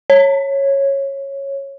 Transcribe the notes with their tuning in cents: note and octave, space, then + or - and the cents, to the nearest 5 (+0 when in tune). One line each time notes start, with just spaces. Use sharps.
C#5 -10